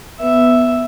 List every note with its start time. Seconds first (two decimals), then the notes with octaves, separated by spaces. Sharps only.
0.20 B3 E5